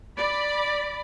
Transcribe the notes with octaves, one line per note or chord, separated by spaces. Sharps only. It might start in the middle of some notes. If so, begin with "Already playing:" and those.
D5 B5